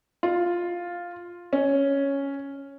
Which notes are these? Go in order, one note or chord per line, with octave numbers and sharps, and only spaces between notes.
F4
C#4